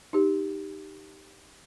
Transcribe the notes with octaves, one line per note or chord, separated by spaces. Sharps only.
D#4 G4